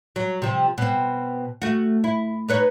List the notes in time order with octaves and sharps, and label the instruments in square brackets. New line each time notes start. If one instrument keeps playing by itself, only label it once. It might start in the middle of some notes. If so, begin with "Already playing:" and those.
[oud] F#3
C3 F3
B2 C4
A3 F#4
E4
D#4 B4 C#5